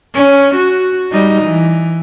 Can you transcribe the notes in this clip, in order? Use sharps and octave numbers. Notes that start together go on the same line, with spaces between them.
C#4
F#4
G3 D#4
E3